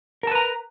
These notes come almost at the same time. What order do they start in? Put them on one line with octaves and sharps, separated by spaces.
A#4 A5 B4 A#5